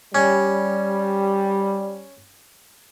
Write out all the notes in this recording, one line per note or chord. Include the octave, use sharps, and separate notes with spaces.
G3 C#4